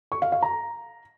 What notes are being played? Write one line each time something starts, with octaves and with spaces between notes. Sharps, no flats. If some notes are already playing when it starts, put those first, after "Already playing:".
C#6
F5
F5
A#5